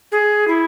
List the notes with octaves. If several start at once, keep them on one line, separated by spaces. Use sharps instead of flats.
G#4
E4